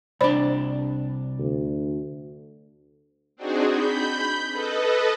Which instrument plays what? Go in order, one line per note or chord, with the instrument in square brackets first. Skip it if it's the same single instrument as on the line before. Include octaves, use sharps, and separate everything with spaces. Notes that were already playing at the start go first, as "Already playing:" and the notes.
[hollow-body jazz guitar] C2 D4 [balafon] C5 D5 B5
[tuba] D2
[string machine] C4 D4 D#4 F#4 G#4
B5 G6
A4 B4 D#5